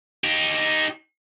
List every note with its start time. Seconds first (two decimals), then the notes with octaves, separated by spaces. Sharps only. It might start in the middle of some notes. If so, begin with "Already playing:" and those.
0.24 D#4 G4